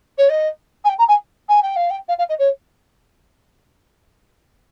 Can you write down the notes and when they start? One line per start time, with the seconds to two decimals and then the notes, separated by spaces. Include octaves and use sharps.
0.18 C#5
0.29 D#5
0.84 G#5
0.89 G5
0.98 A#5
1.08 G#5
1.49 G#5
1.62 G5
1.76 F5
1.90 G5
2.08 F5
2.18 F5
2.29 D#5
2.39 C#5